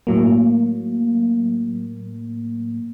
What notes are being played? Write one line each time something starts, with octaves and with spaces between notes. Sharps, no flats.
A2 F#3 A#3